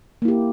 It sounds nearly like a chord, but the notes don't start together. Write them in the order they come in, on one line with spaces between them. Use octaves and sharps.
A#3 E4 G4